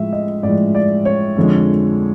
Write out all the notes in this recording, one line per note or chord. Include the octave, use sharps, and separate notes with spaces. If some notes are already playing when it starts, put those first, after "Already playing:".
Already playing: A2 F3 G#3 E5
D#5
A2 F3 G#3 D5
D5
C#5
F2 D3 F3 G#3